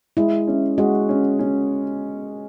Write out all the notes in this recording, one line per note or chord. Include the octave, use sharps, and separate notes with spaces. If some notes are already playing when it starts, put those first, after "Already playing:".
G#3 E4
C#4
G#3 F#4
C#4
C#4